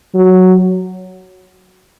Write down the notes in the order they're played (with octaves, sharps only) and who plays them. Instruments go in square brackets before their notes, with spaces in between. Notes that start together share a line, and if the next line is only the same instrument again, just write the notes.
[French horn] F#3